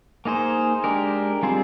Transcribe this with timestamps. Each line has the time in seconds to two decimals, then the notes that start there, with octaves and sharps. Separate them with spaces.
0.25 A#3 D#4 G#4 C5
0.84 G#3 D4 G4 A#4
1.43 G3 C4 F4 G#4 C5